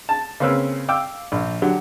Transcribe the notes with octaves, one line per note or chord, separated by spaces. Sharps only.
A5
C#3 A#3 C4 C#4 B4 E6
F5 G5 D6 E6
A#1
D3 F#3 G4